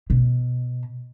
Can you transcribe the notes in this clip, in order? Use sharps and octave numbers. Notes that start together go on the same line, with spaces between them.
B2